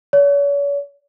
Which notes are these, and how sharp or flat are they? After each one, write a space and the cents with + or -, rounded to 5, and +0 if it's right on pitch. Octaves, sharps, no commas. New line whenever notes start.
C#5 +40